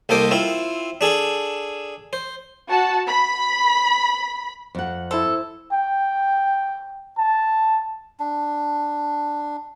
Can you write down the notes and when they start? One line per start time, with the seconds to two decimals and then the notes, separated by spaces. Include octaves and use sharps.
0.09 C2 A#3 A4 C5 D#5 D6
0.31 C4 E4 F4
1.01 D4 G#4 A4
2.13 C5
2.69 F#4 A5
3.07 B5
4.75 F2 F#5
5.11 E4 A4 C5
5.72 G5
7.18 A5
8.20 D4